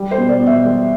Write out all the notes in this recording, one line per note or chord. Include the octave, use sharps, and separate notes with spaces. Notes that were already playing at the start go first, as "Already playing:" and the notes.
Already playing: G3
C5
B2
D5
B2
E5
G3